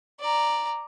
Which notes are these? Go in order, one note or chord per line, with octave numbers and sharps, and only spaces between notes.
D5 A#5